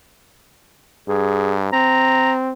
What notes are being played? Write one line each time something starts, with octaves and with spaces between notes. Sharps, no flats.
G2 G#4
C4 A#5